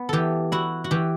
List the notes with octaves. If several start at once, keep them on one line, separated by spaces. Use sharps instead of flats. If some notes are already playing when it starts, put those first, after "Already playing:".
Already playing: B3
E3 G4 A4
E4 F#4
F#4
E3 G4